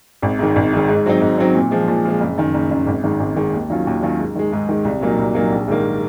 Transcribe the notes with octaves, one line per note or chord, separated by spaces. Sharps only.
G#1
G#2 D#3
G#1
G#2 D#3
G#2
F#3 C4 D#4
G#2
F#3 C4 D#4
A#2
F3 G#3
A#2
F3 G#3
F#1
F#2 D#3
F#1
F#2 D#3
G#1
G#2 D#3 G#3
G#1
G#2 D#3 G#3
D#2
D#3 F#3 C#4 F4
D#2
D#3 F#3 C#4 F4
G#2
D#3 G#3
G#2
D#3 G#3
C2
A#2 F#3 A#3 D#4
C2
A#2 F#3 A#3 D#4
A#1
G#2 D#3 A#3